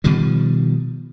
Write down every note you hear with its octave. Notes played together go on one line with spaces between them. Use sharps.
B2 D#3 F3 G3